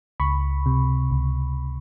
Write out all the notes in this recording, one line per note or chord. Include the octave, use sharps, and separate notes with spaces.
C#2 B5 C#6
C3
C#2